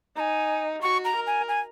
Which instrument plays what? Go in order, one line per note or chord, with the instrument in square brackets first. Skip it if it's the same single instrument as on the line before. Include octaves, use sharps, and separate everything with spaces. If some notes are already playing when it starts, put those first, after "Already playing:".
[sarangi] D#4 [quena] A#5
[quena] G#5
[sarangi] F#4 [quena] C#6
[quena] A#5
[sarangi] A#4
[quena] G#5
G#5